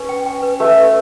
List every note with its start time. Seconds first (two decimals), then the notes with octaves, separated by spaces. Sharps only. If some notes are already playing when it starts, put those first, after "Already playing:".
Already playing: C#4 B4
0.09 G5
0.26 G5
0.43 B4
0.60 A3 B4
0.76 B4